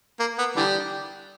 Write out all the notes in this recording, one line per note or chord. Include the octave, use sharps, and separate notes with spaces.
A#3
B3
D3 E3 G3